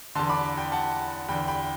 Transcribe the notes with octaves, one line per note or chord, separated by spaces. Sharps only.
E2 D3 A5 C6
B5 D6
G5 B5
F#5 A5
E2 D3 G5 B5
G5 B5